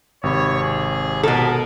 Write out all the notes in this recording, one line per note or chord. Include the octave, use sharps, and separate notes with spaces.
G#1 C3 C#5 B5
G#4
B2 A4 A#4